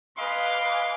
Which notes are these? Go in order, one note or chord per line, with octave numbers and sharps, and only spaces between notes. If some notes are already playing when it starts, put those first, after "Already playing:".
B4 D#5 F5 G#5 C6 D6